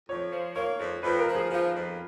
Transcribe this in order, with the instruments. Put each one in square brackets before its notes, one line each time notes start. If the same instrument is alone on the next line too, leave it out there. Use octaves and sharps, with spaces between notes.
[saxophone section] F2 [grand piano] C#5
[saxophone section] F3
[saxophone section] A#3 [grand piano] C#5
[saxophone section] F2
[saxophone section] F2 [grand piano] B4
[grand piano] A#4
[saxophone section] F3
[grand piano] G#4
[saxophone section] F3 [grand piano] F4
[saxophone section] F2